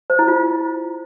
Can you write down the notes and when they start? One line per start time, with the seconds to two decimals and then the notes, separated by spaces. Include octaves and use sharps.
0.10 C5
0.19 E4
0.28 F4